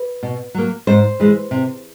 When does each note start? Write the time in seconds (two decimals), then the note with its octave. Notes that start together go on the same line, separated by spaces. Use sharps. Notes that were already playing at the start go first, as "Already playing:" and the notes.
Already playing: B4
0.23 B2
0.54 F#3 A#3
0.87 G#2 C5
1.20 E3 G#3
1.51 C3